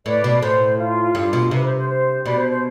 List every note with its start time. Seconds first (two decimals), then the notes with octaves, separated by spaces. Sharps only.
0.05 A2 B4 D5
0.24 B2
0.42 A2 C5
0.79 F4
1.15 G2 F4
1.33 B2
1.51 C3 B4
1.64 C5
1.76 C5
1.88 C5
2.25 B2 B4 D5
2.37 C5
2.49 C5